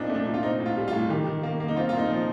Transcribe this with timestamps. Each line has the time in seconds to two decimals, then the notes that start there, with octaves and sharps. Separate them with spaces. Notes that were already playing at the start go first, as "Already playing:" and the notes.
Already playing: A#2 C4 D4 D#4
0.09 A3
0.15 D4
0.27 A#2
0.34 F4
0.43 C4 D#4
0.60 A2
0.66 F4
0.77 G3
0.88 F4
0.93 A2
1.09 D#3 G4
1.27 D#3
1.43 A#3
1.60 A#3
1.68 D#4
1.76 C4 F4
1.89 A#2 F4
1.98 D#4
2.10 F3